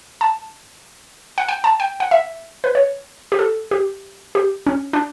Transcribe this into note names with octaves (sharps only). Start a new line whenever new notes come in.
A5
F#5
G5
A5
G5
F#5
E5
B4
C#5
G4
A4
G4
G4
C#4
D4